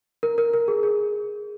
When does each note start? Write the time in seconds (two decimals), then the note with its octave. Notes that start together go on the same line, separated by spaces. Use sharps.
0.23 A#4
0.38 A#4
0.54 A#4
0.68 G#4
0.83 G#4